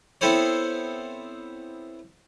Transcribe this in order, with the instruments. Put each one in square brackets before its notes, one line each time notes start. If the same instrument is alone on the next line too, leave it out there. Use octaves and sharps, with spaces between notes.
[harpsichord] B3 C4 E4 A4 C5 C#5